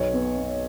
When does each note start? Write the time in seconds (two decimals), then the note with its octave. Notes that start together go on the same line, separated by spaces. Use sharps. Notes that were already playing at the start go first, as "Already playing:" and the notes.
Already playing: B1 C#5
0.13 B3
0.37 B3